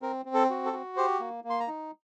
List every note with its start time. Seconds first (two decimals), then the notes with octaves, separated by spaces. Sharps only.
0.02 C4 A#4
0.25 C4
0.34 A4
0.50 F#4
0.65 A4
0.73 F#4
0.97 G4 C5
1.20 A#3
1.44 A#3
1.50 C6
1.60 A#5
1.68 D#4